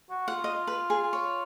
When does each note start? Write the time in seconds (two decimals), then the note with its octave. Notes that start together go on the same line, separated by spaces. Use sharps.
0.10 F#4
0.27 F4 F#5
0.44 D#5
0.67 B4
0.90 G#4
1.13 C#5